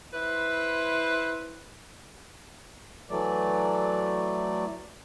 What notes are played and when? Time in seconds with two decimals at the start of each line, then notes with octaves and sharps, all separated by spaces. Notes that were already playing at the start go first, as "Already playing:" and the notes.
0.14 E4 B4 C5
3.10 E3 F#3 A3 D5